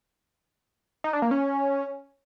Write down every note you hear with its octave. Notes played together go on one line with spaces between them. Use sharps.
D#4
D4
A#3
C#4